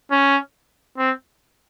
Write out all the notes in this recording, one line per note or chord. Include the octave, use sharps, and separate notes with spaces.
C#4
C4